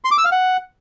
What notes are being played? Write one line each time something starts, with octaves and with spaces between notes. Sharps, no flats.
C6
D6
E6
F5
F#5